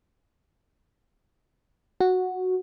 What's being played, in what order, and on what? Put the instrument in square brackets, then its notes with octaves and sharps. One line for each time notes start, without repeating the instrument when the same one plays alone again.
[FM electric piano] F#4